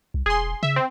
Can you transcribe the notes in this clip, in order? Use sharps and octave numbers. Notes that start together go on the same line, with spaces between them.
C2
E1 G#4 C6
C#3 E5
C4